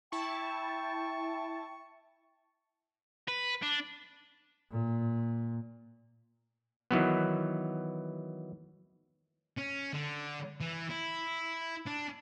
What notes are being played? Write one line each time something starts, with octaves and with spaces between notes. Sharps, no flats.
E4 G5 A5 C#6
B4
D4
A#2
D#3 E3 F#3 B3
C#4
D3
E3
E4
D4